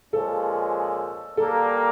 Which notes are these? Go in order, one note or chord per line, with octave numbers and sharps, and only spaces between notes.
A#2 F3 G#3 C#4 A4
A#2 G3 A#3 A4